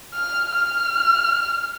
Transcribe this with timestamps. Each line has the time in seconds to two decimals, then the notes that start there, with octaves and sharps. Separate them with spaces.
0.14 F6
0.56 F6